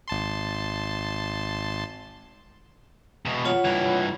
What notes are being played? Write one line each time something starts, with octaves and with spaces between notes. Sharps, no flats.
G#1 A5 C6
E2 B2
F4 C#5 F#5
G2 E3